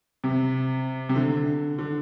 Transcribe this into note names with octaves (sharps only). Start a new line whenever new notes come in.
C3
C3
D3
D3